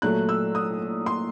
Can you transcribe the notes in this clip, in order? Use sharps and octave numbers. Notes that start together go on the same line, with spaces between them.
A#2 F#3 A3 F#6
E6
D#6
C6